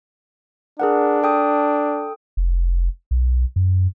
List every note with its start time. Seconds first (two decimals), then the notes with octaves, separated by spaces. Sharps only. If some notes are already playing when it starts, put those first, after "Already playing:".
0.80 D4 G#4 A#4 F#5
1.23 A4 G5 D#6
2.37 F1
3.11 B1
3.56 F#2